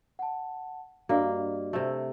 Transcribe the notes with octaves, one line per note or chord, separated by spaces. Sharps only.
F#5 A5
G2 A#3 F#4 D5 D#5
C3 A3